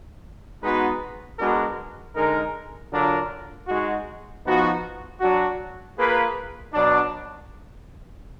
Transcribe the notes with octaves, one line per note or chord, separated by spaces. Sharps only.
G#3 B3 D#4 F#4 B4
G#3 B3 D4 F#4 A#4
D3 G#3 D#4 A#4
D3 F#3 D4 F4 A#4
G#3 D#4 F#4
F3 B3 D#4 F#4
F#3 D4 F#4
A#3 F4 G#4 B4
B2 F#3 D4